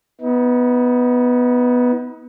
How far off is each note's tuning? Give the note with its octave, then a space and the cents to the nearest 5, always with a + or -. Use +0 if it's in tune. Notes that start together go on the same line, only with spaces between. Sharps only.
B3 +0 D#4 +40